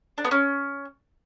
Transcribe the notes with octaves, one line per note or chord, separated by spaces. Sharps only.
D4
B3
C#4